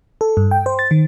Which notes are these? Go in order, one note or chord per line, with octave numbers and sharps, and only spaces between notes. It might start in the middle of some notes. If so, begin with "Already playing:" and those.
A4
G2
G5
C5
A6
D#3